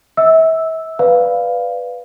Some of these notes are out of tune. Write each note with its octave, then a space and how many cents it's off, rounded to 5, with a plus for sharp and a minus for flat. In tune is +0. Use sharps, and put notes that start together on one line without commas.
E5 -35 E6 -5
B4 +0 D5 +0 F5 +0